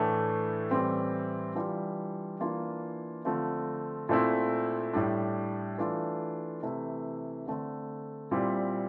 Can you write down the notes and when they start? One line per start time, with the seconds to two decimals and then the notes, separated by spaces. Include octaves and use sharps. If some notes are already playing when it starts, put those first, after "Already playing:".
Already playing: A2 E3 A3 D4
0.71 A2 E3 G3 C4
1.55 E3 G3 D4 F4
2.40 E3 A#3 D4 F4
3.25 D3 F3 A3 C4 F4
4.09 A#2 A3 C4 E4
4.93 A2 G3 D4
5.78 E3 A3 D4 F4
6.63 C3 E3 A3 E4
7.47 D3 A3 C4
8.31 A#2 G3 C4 E4